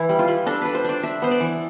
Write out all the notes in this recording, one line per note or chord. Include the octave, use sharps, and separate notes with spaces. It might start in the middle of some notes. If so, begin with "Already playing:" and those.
Already playing: E3 E4
G3
F4
G3
D4 A4
D4 B4
C5
D4 D5
D4 E5
B3 C5
D5
E3